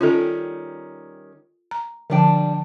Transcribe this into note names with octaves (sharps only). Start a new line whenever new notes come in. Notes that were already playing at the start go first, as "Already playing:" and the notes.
D#3 G3 C#4 F4 A4
A#5
D3 F3 G3 D4 G5